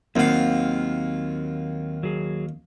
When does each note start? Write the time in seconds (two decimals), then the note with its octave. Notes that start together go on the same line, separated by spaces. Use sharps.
0.16 D#2 F#3 C4 F5 F#5
2.03 F#3 G#4